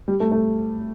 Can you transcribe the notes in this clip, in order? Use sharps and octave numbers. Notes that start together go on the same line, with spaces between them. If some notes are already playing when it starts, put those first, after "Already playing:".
G3
A3
A3